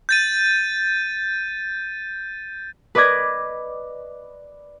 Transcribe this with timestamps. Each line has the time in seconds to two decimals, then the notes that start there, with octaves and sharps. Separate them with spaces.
0.09 G6 A6 D#7
2.95 B4 D5 D#5 D6 G#6 A#6